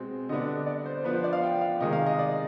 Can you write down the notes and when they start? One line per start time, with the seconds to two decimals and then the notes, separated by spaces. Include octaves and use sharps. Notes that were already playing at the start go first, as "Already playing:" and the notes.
Already playing: B2 G#3 C4
0.29 D3 G3 B3 D4 D#5
0.67 D5
0.86 C5
1.04 F3 B3 D4 B4
1.14 C5
1.24 D5
1.33 F5
1.43 G5
1.61 F5
1.80 C3 D#3 G#3 D#5
1.93 F5
2.06 D#5
2.19 D5